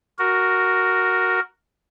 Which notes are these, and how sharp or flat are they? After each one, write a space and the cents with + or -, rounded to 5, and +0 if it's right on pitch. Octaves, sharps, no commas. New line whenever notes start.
F#4 +0 A#4 +0